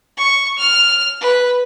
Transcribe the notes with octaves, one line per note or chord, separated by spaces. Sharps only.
C#6
F6
B4